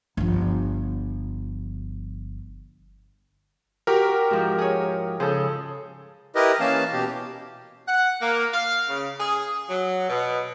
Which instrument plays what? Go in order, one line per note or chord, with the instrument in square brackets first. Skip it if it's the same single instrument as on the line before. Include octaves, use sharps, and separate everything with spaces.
[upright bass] G1 F3
[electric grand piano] F#4 G4 A#4
[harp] G#2 F3
G#4 C#5
[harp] C#3 F3 C5 [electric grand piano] G#4 A4
[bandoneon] E4 G4 A#4 B4 D#5
E3 A#3 C#4 F5 A5
B2 G4
[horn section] F#5
A#3
F5
C#3
G#4
F#3
B2